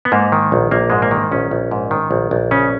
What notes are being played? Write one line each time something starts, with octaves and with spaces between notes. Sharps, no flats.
B3
G#2 A#3
D#3
A#1
A#1 A#3
G#2 G#3
A#3
D#3
A#1 C#4
A#1
G#2
D#3
A#1
A#1
C#3 C#4